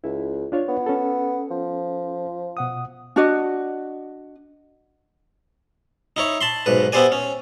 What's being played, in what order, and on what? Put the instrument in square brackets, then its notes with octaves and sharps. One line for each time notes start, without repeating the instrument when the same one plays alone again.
[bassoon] C#2 [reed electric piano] E4
[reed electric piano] D4 F4 C#5
[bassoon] B3
[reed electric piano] C#4 A4
[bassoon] F3
[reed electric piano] B2 F#5 D#6
[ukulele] D4 F#4 D#5
[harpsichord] D#4 E4 C#5
A5 B5 C6
B1 G#2 B4
B3 E4 G4 C5 D5 G#5
C#4